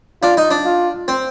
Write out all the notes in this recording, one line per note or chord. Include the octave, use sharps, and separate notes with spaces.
D4 F4
D#4
D4
F4
C4